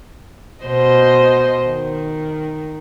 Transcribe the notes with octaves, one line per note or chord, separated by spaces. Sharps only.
B2 C5 D#5
D#3